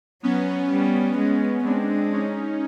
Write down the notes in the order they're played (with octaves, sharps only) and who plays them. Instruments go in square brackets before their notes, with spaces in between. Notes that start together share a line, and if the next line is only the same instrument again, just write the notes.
[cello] F#3 [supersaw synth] B3 C#4
[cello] G3
G#3
[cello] G#3 [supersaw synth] C4 D4
[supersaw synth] C#4 D#4